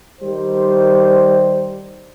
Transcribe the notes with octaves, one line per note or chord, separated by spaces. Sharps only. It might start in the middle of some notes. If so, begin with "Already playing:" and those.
D#3 G3 C5